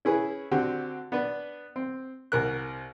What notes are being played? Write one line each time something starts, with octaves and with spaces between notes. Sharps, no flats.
C#4 E4 G#4 B4
D3 C4 F#4 G4
B3 D4 B4
C4
C2 A#4 F#6